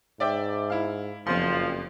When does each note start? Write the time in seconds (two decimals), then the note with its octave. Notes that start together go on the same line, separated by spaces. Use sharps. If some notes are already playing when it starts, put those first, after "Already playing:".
0.20 G#2 D5 E5 G5
0.70 E4 F5
1.27 F#1 F2 F3 C6